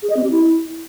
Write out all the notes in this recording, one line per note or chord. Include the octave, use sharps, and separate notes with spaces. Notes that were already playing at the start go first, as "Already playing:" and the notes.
G#4
D#5
C4
G4
E4